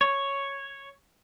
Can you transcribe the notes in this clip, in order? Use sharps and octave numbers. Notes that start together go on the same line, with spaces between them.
C#5